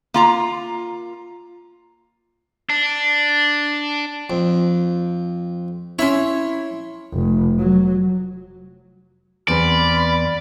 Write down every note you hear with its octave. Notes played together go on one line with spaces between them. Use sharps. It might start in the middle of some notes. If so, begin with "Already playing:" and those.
A#3 F4 A#5
D4
F2
C#4 E4 C#5 B5 C6
F1
F#3
E2 C4 D5 B5 C6 F6